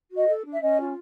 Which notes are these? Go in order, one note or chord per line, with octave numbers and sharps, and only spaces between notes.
F#4
D#5
A4
D4
E5
C#4 D#5
F4